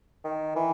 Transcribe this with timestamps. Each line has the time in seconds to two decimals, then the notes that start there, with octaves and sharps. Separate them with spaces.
0.24 D#3
0.55 E3